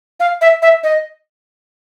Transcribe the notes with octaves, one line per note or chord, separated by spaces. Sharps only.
F5
E5
E5
D#5